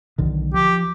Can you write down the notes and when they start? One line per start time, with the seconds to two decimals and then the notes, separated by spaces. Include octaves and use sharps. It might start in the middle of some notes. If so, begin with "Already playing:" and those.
0.18 B1 D3 D#3
0.54 F3 G4